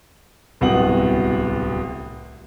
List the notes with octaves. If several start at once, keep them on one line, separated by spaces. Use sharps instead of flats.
D1 C2 B2 B3 F#5 F#7